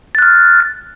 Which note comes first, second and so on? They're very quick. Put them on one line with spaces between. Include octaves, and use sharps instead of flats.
A6 F#6 F6